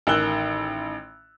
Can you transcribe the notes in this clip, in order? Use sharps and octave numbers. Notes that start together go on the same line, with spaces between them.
A1 D#3 E6 F#6 G7